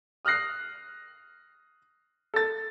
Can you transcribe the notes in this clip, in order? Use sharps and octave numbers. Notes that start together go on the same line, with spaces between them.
D#6 F6 F#6 A#6 C7
A4 A6